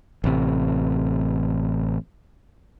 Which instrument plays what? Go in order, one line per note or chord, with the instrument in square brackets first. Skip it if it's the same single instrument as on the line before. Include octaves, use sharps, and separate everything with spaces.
[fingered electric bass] A1 C3